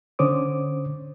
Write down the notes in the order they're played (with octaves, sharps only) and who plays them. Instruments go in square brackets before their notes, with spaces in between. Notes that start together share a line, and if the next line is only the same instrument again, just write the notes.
[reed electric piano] D3 C#4 C5 C#5 D6 D#6